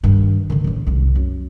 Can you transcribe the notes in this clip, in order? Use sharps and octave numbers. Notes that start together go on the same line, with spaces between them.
G2 D#3
D3 D#3
A1 D#3
C2 G#2
F#2